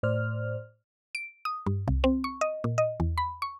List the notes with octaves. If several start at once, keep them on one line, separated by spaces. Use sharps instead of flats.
A2 C5 D5 F6
D7
D#6
G2
C2
C4
C#6
D#5
A#2
D#5
E2
B5
C#6